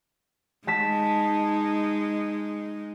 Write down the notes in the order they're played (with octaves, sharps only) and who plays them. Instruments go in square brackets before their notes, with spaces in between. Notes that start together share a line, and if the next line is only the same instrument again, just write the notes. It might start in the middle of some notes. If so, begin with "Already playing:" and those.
[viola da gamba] G#3 D#4 [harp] A5 B6 E7